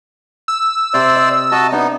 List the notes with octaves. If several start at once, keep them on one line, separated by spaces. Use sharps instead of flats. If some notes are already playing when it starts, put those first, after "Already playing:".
E6
C3 C5 D5
D#5
F#4 D#5 A5 A#5
B3 D4 D#4 D#5